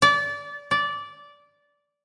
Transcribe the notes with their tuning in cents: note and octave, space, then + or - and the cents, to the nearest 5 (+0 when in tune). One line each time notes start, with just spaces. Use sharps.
D5 -25
D5 -15